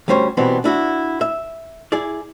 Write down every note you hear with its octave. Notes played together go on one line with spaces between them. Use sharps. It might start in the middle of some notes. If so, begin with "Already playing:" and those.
D2 G3 C#4 C5 C#5
B2 E3 G3 B3 C4
D4 E4 F#4
E5
E4 G#4 D5